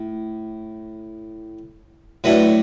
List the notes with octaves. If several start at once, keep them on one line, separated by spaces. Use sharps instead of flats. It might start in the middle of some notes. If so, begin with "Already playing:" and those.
Already playing: A2
A2 F#3 A3 D4 B4